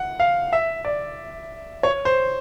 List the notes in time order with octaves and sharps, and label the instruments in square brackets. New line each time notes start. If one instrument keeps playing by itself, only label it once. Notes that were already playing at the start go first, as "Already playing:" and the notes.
Already playing: [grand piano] F#5
F5
E5
D5
C#5
C5